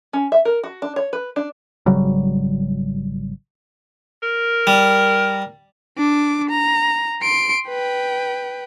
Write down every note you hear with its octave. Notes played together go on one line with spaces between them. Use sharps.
C#4
E5
A#4
F#4
D4
C#5
B4
D4
G#1 C#3 F#3 G3
A#4
G3
D4 D6
A#5
C6 D7
B4 G5